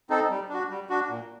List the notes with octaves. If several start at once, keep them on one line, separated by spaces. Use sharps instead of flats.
C4 D#4 A4
G3
D4 F#4
G3
D4 F#4
A#2